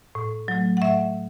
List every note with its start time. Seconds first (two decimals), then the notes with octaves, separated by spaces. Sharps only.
0.15 A2
0.48 F#3 A3
0.77 F#5
0.82 A2 E5